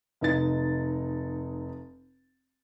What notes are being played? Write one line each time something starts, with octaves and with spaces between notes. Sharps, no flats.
F1 D#4 A6